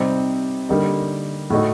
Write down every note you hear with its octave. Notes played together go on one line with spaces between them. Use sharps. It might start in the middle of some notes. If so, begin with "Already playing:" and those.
Already playing: C3 G3 C4 D#4 G4
D3 G3 A#3 D#4
A2 A3 D#4 F#4